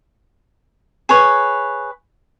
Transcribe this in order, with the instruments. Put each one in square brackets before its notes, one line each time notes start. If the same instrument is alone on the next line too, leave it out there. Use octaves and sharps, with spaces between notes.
[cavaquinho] G#4 B4 C#5